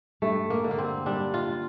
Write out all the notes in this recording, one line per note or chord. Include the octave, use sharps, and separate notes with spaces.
G2 A3
A#3
D3
A#3
C4
G3 D4
F4